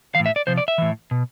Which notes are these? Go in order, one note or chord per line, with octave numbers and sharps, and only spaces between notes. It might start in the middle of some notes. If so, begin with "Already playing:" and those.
A2 E3 F5
E5
D5
C3 F3 C5
D5
E5
A2 E3
B2